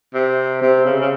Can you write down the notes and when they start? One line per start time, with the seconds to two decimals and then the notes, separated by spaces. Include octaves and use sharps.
0.14 C3
0.62 C3
0.85 C#3
1.00 C#3